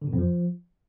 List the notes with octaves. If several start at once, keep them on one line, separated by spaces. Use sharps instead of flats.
D3
B2
F2
F3